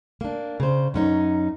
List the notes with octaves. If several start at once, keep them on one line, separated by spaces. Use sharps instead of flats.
A#3 D4
C#3 C5
F#2 C#4 D#4